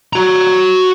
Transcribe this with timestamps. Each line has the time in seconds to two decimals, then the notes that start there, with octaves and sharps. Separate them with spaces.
0.13 F#4 A#5